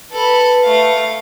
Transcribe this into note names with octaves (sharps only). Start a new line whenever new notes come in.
A4 B4 B5
A3 F5